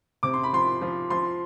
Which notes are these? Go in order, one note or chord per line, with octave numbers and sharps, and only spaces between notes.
C3 D6
C6
B5
F3 C6
F3
F3 C6